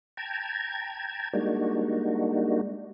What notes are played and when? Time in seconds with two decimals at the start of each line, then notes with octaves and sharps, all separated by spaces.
0.17 G5 A5 A#5 G#6
1.33 G3 G#3 A#3 D4 D#4 F#4